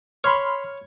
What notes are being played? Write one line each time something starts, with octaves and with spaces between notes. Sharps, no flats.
C#5 B5 C6 F6